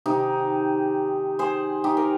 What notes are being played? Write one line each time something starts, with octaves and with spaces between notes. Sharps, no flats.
C3 D#3 G#3 D#4 G4
G#4 C5
D#4 G4
A#4